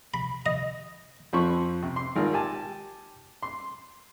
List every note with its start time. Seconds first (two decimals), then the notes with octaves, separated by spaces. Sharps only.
0.14 B5
0.46 D#5
1.33 F2 F3 C4 C5 B5 C#6
1.83 C3
1.96 C6
2.16 G#1 F4 A#4
2.33 G4 G#5 A5
3.43 C6